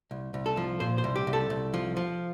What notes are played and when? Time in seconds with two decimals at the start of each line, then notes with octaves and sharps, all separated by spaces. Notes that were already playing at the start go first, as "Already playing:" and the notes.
0.11 C2
0.34 C2
0.46 A4
0.57 F3
0.80 A#2 C5
0.98 C5
1.04 C2
1.16 G4
1.27 C2
1.33 A4
1.50 C2
1.74 F3
1.97 F3